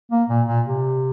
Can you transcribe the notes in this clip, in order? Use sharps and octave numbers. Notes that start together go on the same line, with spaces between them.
A#3
A#2
A#2
C3